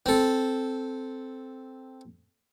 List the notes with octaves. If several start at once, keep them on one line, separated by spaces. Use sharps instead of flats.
C4 A4